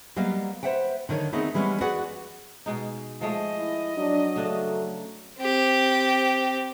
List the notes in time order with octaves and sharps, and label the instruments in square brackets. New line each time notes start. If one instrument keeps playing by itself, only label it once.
[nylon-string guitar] F#3 G3 A#3 B3 D#5 F5
B4 C5 D5 E5 F#5 G5
D3 D#3 A#4 C#5
A3 B3 C4 D#4 G#4
E3 G3 G#3 A#3 B3 C#4
F#4 G#4 B4 D5 F#5
[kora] B2 G#3 D#4
[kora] F3 G#3 A3 [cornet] D#5
[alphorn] E4
[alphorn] F#3 [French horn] D4
[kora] C#3 D4 [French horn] A3
[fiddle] C4 G4